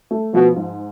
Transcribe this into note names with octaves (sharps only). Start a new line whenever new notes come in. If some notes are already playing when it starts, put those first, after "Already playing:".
A3
B2 F3
G#2